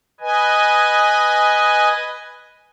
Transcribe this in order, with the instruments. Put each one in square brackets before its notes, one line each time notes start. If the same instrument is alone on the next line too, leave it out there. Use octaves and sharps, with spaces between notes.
[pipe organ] B4 D#5 G#5